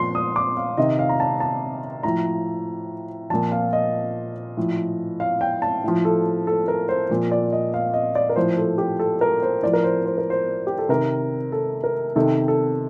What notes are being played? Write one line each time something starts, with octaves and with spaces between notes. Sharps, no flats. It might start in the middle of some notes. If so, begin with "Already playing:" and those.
Already playing: A#2 F3 C6
D#6
D6
F5
C3 D#3 D#5
F5
A#5
A5
A5
A2 F3 A#5
A#2 F3 A5
F5
D#5
A2 F3
F5
G5
A5
A2 F3
A4
A4
A#4
C5
A#2 F3
D5
D#5
F5
D#5
D5
A#4
A2 F3 C5
A4
G4
A4
A#4
C5
A2 F3 D5
A#4
C5
C5
A#4
C5
G4
A4
C3 D#3 A#4
A4
A#4
C3 D#3 A4
A4